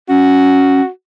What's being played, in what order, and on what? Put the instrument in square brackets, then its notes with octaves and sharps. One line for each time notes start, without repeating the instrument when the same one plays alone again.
[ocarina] C#4 [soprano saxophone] F#4